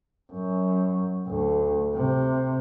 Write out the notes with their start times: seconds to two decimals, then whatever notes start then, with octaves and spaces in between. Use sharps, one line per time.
0.32 F#2
1.27 D2
1.94 C3